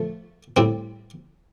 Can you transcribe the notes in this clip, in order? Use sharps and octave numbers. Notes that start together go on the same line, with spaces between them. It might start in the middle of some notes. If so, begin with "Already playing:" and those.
Already playing: F3 A3
A2 G3 C4